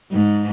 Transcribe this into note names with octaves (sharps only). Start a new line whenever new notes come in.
G#2